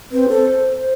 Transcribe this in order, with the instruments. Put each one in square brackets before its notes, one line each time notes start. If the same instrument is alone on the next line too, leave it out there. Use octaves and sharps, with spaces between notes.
[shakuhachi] C4 [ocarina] B4
[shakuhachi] A4 [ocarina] C5